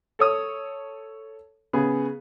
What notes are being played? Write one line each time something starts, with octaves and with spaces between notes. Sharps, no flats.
A4 C#5 D#6
C#3 B3 G#4